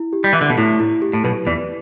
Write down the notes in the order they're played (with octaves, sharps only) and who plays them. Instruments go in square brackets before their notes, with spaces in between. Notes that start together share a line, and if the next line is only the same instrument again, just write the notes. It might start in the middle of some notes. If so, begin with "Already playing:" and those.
Already playing: [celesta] E4
G4
[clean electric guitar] G3
[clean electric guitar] E3 [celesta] E5
[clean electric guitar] D3
B2
[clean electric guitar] A2 [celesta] E4
[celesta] E4
G4
[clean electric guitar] A2
[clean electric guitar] B1 B2 [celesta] B4
[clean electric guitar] E2 E3 [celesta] D5